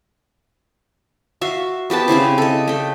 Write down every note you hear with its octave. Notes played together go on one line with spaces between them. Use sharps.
F#4 E5 F5
B3 G4 B4 A5
C#3 C4 E4 C5
A4 D#5
A3 G5